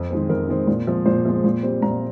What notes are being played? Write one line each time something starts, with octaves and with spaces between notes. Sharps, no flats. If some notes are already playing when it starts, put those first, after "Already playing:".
Already playing: F2
D#3 G#3 C4
F2 A#4
D#3 G#3 C4
A#2
F3 G#3 C4
A#2 C5
F3 G#3 C4
A#2
G3 C4
A#2 A#5